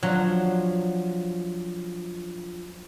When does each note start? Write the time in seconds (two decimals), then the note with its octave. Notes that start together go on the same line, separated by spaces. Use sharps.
0.03 F3 F#3 D4